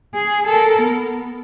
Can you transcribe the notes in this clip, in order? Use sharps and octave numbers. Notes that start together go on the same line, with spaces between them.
G#4
A4 A#4
B3